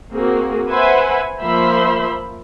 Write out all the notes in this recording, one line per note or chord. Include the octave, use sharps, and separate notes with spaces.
A#3 C4 F#4 G#4
B4 C5 E5 F#5 G#5 B5
F3 A#3 C5 E5 B5 C6